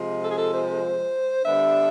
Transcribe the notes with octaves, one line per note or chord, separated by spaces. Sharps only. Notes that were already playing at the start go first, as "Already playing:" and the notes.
Already playing: C3 F3 G#3
A4
G#4
A4
C5
D3 G3 B3 D4 E5